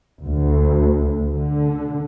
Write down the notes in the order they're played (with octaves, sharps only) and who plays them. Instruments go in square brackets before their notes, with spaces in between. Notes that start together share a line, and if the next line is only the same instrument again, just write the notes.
[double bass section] D2
D3